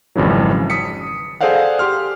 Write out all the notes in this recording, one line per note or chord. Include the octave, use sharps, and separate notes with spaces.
G#1 F2 C#3 E3 F#3
D#6 B6 C#7
G#4 A4 C5 D5 F5 F#5
G4 C6 F6